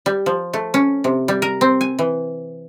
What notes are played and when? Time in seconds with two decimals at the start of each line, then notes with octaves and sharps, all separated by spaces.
0.06 G3
0.26 F3
0.53 A3
0.74 C#4
1.04 C3
1.28 G3
1.42 A#4
1.61 C4
1.81 G#5
1.99 E3